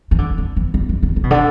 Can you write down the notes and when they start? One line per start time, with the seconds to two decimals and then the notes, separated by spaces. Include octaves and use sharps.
0.11 E3
0.18 D3
0.38 D3
0.56 E3
0.74 D3
0.89 E3
1.03 D3
1.16 D3
1.24 B2
1.31 D3